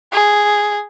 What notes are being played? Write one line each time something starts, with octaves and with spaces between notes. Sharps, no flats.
G#4